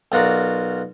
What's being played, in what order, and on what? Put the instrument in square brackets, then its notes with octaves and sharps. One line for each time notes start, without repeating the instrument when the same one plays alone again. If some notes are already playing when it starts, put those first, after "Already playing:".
[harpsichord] B1 F4 F#4 A#4 D5